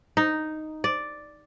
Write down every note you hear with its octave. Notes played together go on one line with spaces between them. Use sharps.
D#4
D5